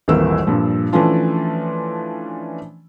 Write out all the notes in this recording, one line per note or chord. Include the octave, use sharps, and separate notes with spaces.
D#1 G#1 E3 A#3 E6
G2 A#2 F3
E3 F3 A3 C#4 D4 F4